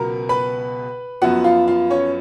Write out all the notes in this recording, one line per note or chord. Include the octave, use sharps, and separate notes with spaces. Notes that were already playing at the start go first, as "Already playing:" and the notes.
Already playing: C#2 B2 F#3 B3 A#4 A#5
B4 B5
F#2 F3 B3 F#4 F#5
F4 F5
F4 F5
C#4 C#5